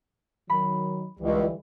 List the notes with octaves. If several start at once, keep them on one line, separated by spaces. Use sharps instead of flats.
D#3 F#3 B5
C#2 D3 E3 G3